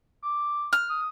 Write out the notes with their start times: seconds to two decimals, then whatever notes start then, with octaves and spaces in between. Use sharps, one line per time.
0.23 D6
0.73 F6
0.89 D#6